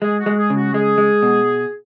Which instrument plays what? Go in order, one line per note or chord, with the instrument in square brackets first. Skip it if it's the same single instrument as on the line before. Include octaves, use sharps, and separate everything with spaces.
[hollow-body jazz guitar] G#3 [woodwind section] G#4
[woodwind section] F#4
[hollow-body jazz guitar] G#3
[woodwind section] G#4
[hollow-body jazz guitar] C#3
[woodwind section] F#4
[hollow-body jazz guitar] G#3 [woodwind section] G#4
[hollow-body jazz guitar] G#3
B2